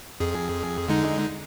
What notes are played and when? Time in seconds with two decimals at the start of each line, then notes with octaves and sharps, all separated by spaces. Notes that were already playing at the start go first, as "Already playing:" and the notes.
0.20 F2 G#4
0.88 D3 G#3 D#4